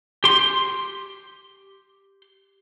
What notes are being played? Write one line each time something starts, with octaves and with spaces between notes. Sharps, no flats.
G4 C6